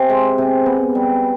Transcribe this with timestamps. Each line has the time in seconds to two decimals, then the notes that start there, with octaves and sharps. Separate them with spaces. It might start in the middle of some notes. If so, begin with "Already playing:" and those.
Already playing: C3 G#5
0.10 G#3
0.38 C3
0.66 B3
0.95 G3